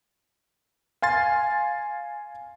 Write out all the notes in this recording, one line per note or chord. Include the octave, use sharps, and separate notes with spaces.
F5 G#5 C6 A6